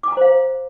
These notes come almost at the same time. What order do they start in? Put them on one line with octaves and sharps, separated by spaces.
D6 G#5 A#5 C5 F5